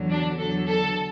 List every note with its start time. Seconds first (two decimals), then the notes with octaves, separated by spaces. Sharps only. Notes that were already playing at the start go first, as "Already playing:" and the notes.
Already playing: E2 D3 F#3
0.11 D4
0.39 E2 D3 F#3 A4
0.67 A4